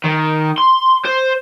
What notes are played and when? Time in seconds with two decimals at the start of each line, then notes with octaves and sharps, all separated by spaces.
0.04 D#3
0.58 C6
1.05 C5